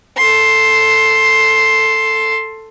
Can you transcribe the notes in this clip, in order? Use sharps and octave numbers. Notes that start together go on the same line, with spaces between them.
A4 C6